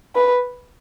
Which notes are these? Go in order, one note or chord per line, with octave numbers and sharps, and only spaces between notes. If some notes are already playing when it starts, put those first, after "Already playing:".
B4